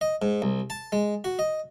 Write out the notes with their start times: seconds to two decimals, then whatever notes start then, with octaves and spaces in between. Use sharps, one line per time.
0.01 D#5
0.22 G#2
0.42 C2
0.70 A5
0.92 G#3
1.24 F#4
1.39 D#5